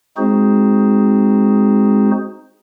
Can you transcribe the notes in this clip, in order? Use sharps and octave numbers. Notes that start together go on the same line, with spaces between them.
G#3 C4 D#4 F#4 G#4 C5